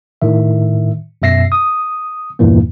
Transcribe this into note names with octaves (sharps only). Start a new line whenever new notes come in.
A2 D#3 E5
F#2 B2 E5 A#6 C7
D#6
E2 G2 A#2 E3 A#3